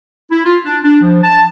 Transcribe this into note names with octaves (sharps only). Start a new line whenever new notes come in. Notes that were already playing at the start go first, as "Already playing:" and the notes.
E4
F4
D4
D4
F3
A5